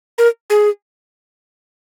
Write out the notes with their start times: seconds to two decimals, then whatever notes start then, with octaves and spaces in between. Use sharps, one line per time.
0.18 A#4
0.50 G#4